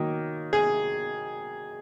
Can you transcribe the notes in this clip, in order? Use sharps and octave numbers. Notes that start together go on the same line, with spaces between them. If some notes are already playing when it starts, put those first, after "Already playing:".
Already playing: D#3 F#3 A#3
G#4